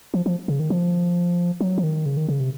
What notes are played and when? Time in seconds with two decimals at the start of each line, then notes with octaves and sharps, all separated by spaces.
0.14 F3
0.26 F3
0.48 C#3
0.60 D#3
0.70 F3
1.61 F#3
1.78 F3
1.83 D#3
2.06 C#3
2.17 D#3
2.29 C#3
2.40 C3